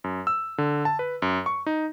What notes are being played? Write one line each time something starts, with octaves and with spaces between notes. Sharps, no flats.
F#2
E6
D3
A5
B4
F#2
C#6
D#4